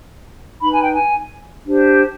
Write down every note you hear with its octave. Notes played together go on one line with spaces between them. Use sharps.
D#4 B4 B5
G#5
G5
G#5
D4 G4 C5